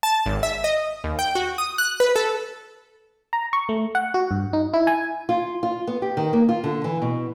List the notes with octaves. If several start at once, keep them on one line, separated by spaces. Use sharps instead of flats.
A5
G#1
E5
D#5
D#2
G5
F#4
D#6
F#6
B4
A4
A#5
C#6
A3
F#5
F#4
G2
D#4
E4
G#5
F4
F4
B3
G4
D#3
A#3
F4
D3
E3
B2